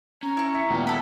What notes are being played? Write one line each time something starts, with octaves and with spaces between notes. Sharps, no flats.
C#4 A#5
E4 C#6
E5 B6 C#7
D#2 A#2 G#3 B3 D5
A4 B4 E5 B5